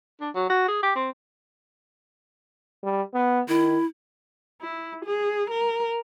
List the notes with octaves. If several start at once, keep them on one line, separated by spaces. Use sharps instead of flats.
D4
F#3
F#4
G#4
G4
C4
G3
B3
D#3 E4
E4
G#4
A#4